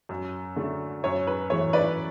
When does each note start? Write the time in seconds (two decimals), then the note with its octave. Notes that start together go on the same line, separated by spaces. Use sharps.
0.09 F#2
0.56 D3 A3
1.04 F#2 C#5
1.27 B4
1.50 E3 A3 C#5
1.73 B4 D5